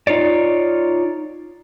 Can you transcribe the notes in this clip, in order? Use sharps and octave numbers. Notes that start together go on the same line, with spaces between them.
D#4 F4 C#5 D5